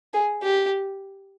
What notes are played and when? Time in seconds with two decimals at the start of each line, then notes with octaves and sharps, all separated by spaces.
0.14 G#4
0.43 G4